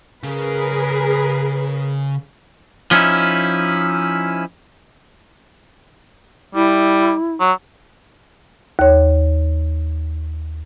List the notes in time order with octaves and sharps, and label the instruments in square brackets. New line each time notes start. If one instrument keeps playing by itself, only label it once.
[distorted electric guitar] C#3 [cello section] G#4 A#4 B4
[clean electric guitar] F3 C#4 D#4 E4
[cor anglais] G3 [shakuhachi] E4
[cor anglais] F#3
[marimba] D#2 C#5